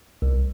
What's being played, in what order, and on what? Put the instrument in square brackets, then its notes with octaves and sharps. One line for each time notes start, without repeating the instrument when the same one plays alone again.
[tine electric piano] C2